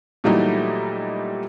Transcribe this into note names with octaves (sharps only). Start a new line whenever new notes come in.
A#2 E3 F#3 G3 A3 D#4